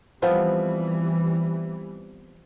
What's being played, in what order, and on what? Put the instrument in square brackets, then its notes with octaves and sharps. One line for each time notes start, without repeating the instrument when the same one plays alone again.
[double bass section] E3 G3 [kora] F3 B3 C4